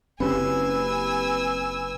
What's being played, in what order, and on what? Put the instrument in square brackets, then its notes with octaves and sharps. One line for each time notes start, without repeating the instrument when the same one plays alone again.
[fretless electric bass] F#1 C#4 [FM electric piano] C4 G4 [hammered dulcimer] B4 [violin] G#5 E6